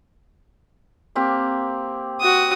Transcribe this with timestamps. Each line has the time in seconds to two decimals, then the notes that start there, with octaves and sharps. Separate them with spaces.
1.15 A#3 C4 G4
2.21 F#4 D#6